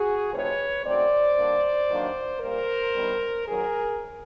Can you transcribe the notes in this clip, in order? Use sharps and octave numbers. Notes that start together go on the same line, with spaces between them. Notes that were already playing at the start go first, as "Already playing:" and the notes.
Already playing: F#4 G#4
C3 F3 A3 C4 D#4 B4 C#5
F#2 D#3 F#3 A3 C4 C5 D5
D3 G3 A#3 D4
D#2 D#3 F#3 A#3 D4
A#2 G3 A#3 A#4 C5
G2 D#3 G3 B3
D#2 D#3 F#3 G#4 A#4